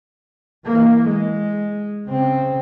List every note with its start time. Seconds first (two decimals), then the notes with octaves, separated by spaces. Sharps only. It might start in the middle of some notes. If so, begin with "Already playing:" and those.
0.65 E3 A#3
1.09 G#3
2.08 C#3 C4